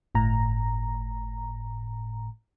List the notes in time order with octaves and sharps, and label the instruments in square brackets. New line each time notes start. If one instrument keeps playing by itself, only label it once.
[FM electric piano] G1 A2 A#5